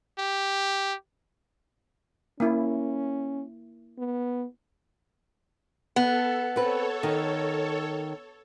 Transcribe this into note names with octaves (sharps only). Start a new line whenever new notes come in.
G4
A#3 C#4 E4
B3
B3 A4
C4 A4 B4 C#5
D#3